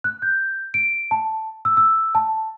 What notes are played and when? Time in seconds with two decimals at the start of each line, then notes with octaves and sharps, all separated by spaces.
0.04 F#6
0.22 G6
0.74 D7
1.11 A5
1.65 E6
1.77 E6
2.15 A5